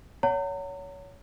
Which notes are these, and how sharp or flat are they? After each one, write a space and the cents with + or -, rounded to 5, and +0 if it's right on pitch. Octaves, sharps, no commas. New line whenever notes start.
C#5 +25 F#5 +0 A#5 -40